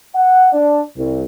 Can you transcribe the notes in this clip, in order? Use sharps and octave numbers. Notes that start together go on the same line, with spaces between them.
F#5
D4
C2